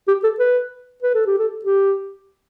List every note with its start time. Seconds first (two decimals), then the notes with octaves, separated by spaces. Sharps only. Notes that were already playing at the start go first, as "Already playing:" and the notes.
0.08 G4
0.24 A4
0.39 B4
1.03 B4
1.15 A4
1.27 G4
1.39 A4
1.65 G4